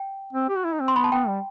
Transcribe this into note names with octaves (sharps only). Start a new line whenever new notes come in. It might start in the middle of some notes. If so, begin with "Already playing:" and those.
Already playing: G5
C4
G4
F#4
E4
D#4
C4
C6
B3 B5
A5
B3 G5
G3